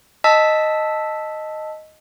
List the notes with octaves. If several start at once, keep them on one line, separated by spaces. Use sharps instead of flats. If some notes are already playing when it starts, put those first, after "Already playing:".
D#5 A5 E6 B6